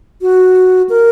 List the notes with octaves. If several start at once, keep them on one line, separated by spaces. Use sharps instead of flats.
F#4
A#4